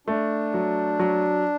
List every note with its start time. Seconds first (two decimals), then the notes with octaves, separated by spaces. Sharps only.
0.07 A3 D4
0.54 F#3
0.99 F#3